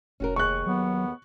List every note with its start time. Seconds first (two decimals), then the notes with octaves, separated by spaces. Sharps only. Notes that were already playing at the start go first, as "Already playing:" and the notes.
0.20 F1 C#4 F#4 A#4
0.36 D#2 G#4 C#6 F#6
0.66 F#3 B3